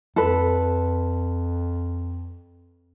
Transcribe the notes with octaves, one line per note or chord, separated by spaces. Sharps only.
F2 A4 B4